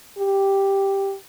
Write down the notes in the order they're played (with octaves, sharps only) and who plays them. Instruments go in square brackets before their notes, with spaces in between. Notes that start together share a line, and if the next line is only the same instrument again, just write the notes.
[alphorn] G4